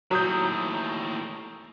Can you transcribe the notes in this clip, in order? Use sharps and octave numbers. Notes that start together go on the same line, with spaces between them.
D#2 A2 F#3 A#5 D#6 G6